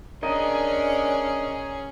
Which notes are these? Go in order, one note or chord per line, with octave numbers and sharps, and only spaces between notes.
C#4 D4 G#4 A#4 D#5